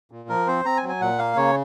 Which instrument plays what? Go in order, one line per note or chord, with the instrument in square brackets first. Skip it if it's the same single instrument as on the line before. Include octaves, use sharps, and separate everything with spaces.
[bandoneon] A#2
F3 A#4
C4 C5
C4 A#5
G#5
F#3
G#5
A#2 F#5
A#3 F5
C#3 C#5